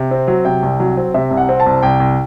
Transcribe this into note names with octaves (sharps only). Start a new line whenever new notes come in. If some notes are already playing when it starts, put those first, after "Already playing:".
Already playing: C3
C4
F#3
C3 G5
C2
F#3
C4
C3 E5
C2
F#5
C4
A5
C2
C2 G5
C2